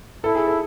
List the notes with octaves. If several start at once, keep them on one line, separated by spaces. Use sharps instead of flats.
E4 A4
G#4
A4